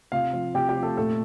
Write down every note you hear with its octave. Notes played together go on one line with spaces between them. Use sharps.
C3 F4 F5
F3
C3 G4 G5
G4 G5
F3
A3 A4
A#2 A3 A4